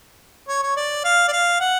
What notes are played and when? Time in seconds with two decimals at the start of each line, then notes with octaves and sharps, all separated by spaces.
0.48 C#5
0.63 C#5
0.77 D5
1.05 F5
1.28 D5
1.32 F5
1.60 F#5